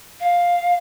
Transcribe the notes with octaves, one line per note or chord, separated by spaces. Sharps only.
F5